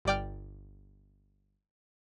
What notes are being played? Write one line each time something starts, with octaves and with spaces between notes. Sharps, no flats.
G1 G3 D5 G5 F6